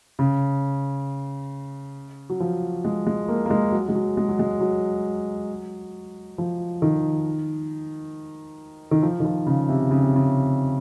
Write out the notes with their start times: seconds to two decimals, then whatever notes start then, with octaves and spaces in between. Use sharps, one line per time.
0.19 C#3
2.30 F#3
2.40 F3
2.85 G#3
3.07 G#3
3.29 A#3
3.46 A#3
3.50 G#3
3.72 F#3
3.89 G#3
3.95 F#3
4.17 G#3
4.29 F#3
4.39 G#3
4.61 F#3
6.38 F3
6.82 D#3
8.91 D#3
9.03 F3
9.20 D#3
9.25 F3
9.46 C#3
9.69 C3
9.91 C#3
10.03 C3
10.15 C#3